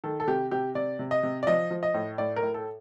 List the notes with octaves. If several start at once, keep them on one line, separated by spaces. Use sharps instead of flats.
D#3 A4
A4
C3 G4
C3 G4
C3 D5
C3
D#5
C3
D5
F3 D#5
F3
D#5
A2
A2 D5
A#4
A2
A4